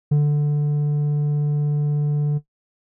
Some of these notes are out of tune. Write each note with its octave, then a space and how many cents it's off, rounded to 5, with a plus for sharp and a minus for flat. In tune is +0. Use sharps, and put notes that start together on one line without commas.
D3 +5